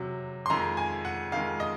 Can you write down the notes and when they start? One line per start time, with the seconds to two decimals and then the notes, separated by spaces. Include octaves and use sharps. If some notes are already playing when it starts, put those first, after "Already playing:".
Already playing: C3 F#3
0.46 C6
0.50 F2 D#3 G#3 A#5
0.77 G#5
1.05 F#5
1.32 F2 D#3 G#3 F5
1.60 D#5